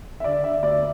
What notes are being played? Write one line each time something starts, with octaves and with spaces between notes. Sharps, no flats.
E5
D3 D5
D3 E5
D2 D5